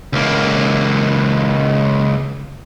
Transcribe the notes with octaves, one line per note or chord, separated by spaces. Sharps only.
C#2 A#3